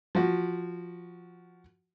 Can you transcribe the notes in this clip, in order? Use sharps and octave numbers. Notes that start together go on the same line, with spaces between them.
F3 F#4